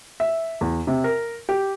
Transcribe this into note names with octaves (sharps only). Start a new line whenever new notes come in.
E5
E2
C3
A#4
G4